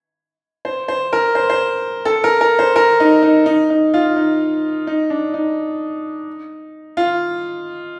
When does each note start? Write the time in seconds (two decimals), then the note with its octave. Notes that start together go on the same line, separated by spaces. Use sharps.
0.65 C5
0.88 C5
1.13 A#4
1.35 C5
1.50 C5
2.05 A4
2.24 A#4
2.41 A#4
2.59 C5
2.76 A#4
3.00 D#4
3.22 D#4
3.46 D#4
3.70 D#4
3.94 F4
4.16 D#4
4.87 D#4
5.10 D4
5.34 D#4
6.97 F4